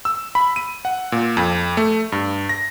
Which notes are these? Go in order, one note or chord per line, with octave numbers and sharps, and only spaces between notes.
E6
B5
D#7
F#5
A#2
F2
A3
G2
A#6